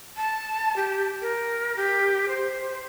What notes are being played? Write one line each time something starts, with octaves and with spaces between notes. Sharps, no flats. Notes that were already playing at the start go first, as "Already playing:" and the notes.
A5
G4
A#4
G4
C5